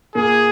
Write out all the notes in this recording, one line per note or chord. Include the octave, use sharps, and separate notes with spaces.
A#2 A#3 G#4